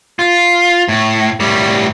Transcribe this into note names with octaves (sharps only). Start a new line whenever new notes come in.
F4
A2
A2 G3